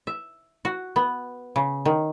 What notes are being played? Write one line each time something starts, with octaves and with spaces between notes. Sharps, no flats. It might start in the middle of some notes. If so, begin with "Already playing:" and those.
E5
F#4
B3
C#3
D#3